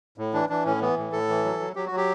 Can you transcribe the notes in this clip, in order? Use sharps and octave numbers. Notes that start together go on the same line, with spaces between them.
A2
E3 D4
E3 D4
A2 C#4
E3 B3
A2
A2 A4
E3
F#3
F#3
F#3 G4
F#4
F#3
G4